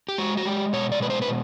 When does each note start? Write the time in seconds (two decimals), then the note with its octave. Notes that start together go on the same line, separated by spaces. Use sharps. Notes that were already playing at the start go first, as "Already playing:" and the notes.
0.09 G4
0.18 G#3 F#4
0.37 F#4
0.45 G#3 G4
0.73 B2 C#5
0.92 D5
1.01 G#3 B4
1.10 C5
1.22 B4
1.28 B2